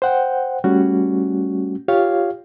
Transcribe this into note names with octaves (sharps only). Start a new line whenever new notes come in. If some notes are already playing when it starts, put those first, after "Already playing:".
C5 F#5 G5
G3 A3 C#4 F#4
F4 G4 C#5 F5